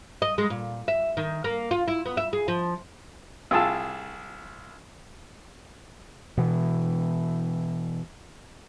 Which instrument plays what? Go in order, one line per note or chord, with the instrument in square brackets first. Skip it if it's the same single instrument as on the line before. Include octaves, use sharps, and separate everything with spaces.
[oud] D#5
G#3
A#2
E5
D#3
A#3
F4
E4
B3
E5
G#4
F3
[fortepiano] C2 F4 G#4 A5 E6
[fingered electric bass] B2 E3